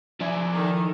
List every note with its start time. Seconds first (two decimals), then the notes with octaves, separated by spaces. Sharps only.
0.20 F3 E4 D5 E5 G#5
0.51 D#3 A4 A#4